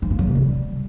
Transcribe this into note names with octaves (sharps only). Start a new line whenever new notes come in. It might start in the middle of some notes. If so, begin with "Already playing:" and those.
F3
A#3
F#3
C3
G3